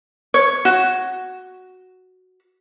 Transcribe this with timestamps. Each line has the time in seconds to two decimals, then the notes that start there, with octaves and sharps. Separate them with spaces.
0.34 C#5
0.65 F#4